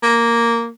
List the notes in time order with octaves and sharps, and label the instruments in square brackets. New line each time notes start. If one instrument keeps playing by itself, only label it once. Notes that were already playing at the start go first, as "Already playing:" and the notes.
[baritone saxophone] A#3